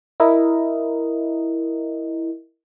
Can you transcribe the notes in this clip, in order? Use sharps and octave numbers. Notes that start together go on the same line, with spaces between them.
E4 A#4 D#5